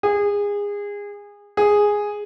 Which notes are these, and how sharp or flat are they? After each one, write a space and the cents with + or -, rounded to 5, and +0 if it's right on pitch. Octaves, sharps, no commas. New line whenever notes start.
G#4 -25
G#4 -5